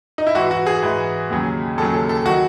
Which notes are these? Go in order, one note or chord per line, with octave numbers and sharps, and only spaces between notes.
D#4
E4
G#2 E3 F#4
F#4
G#4
G#2 E3
D#2 C#3 F#3
D#2 C#3 F#3 A4
A4
A4
D#3 F#3 F#4